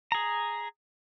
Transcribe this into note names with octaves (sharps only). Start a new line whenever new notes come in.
G#4 A#5